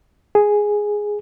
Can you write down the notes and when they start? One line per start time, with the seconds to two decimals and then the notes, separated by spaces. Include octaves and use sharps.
0.35 G#4